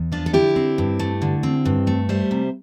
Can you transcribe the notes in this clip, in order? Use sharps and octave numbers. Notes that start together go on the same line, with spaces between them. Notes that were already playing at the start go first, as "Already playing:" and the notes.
Already playing: E2
F3 D4 F4
A4
D3 E4 G4
C4
G2
A3
D3
C4
G2
A3
G3 C5 E5
C3